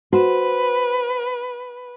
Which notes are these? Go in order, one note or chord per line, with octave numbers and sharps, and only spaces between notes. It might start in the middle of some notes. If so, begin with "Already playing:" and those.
F#4 B4 C5